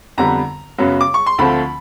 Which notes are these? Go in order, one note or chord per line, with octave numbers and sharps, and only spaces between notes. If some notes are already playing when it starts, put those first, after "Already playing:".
F2 D3 G3 B3 A#5
F#2 C#3 F#3 B3
D6
C#6
C6
D2 D3 F3 A3 C4 B5